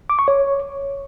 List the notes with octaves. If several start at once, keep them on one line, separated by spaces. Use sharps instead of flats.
D6
C#6
C#5